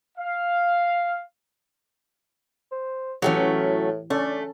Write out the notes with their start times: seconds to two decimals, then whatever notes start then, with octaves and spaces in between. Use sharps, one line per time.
0.18 F5
2.72 C5
3.22 A2 E3 F#3 A3 C#4 G4
4.10 A3 C#4 D4 A4